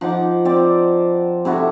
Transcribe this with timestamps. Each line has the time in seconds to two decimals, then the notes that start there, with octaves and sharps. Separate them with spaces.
0.01 F3 D#4 F#5 D6
0.45 C4 D5 D6
1.45 C3 E4 F#4 A4